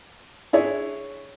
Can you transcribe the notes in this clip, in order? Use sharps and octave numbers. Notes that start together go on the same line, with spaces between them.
D4 E4 G#4 C#5